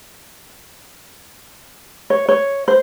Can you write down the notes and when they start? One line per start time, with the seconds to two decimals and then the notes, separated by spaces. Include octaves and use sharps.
2.10 C#5
2.29 C#5
2.68 C5